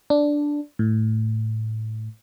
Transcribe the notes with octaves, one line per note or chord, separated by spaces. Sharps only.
D4
A2